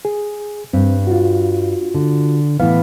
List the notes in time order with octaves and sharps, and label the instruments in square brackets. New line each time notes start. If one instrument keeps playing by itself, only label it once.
[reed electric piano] G#4
[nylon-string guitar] G2 [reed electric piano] C4
[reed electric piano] F4 F#4
[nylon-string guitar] D3
[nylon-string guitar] A2 E3 B3 [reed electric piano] F5